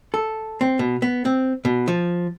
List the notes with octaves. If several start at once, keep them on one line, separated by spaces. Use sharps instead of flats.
A4
C4
B2
B3
C4
B2
F3